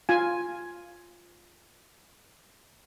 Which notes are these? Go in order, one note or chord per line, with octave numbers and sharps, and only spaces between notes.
F4 G#5